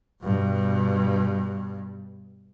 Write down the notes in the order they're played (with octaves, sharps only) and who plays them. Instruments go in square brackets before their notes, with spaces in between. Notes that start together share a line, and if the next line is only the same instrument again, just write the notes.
[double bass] G2 B2